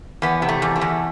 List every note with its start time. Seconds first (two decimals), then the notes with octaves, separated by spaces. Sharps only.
0.22 E2 B3
0.42 C3
0.49 A3
0.62 E2
0.76 A3
0.81 E2